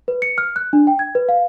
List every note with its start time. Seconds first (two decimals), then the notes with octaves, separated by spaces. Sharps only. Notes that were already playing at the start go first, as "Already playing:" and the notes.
0.08 B4
0.22 C#7
0.38 F6
0.56 F#6
0.73 D4
0.87 G5
0.99 G#6
1.15 B4
1.29 F5